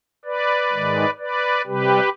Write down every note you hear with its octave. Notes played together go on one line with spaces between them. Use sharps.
B4 D5
G#2 D#3 G#3
B4 D5
C3 G3 G4 B4